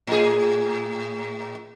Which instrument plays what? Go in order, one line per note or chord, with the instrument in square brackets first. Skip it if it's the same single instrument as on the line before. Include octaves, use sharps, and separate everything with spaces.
[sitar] A2 G#4